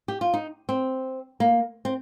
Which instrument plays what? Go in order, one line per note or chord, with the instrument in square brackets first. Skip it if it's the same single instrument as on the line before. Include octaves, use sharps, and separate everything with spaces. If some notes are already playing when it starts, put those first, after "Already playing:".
[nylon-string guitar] G4
F4
D#4
C4
A#3
C4